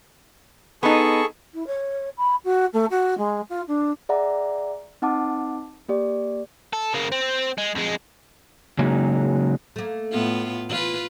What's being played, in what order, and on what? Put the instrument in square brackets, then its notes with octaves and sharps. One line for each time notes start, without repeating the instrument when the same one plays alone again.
[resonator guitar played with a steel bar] B3 D#4 [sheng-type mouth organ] G#4 A4 C#6
[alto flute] E4
C#5
B5
F#4
A3
F#4
G#3
F4
D4
[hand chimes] G#4 D5 E5 F#5 A#5
C4 D#4 F#5 A5 D6
A#3 G4 D5
[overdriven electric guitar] A4
C#3 A#3
C4
G#3
F2 G#3
[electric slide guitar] C#3 F#3 G#3 A#3 D#4
[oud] A3 A#3
[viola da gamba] A2 B3 F4
[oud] E3 [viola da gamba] F4 B4